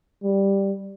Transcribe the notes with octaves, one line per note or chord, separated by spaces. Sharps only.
G3